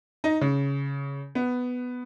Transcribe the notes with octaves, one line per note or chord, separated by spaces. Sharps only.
D#4
C#3
B3